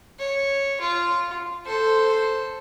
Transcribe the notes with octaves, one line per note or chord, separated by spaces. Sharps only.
C#5
F4
A4 C5